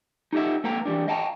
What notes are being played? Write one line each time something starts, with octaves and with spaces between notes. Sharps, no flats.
D#4 G4 A4 D#5 E5
A#3 A4 B4 G5 A#5
E3 G3 D4
D#5 F5 G5 A5 A#5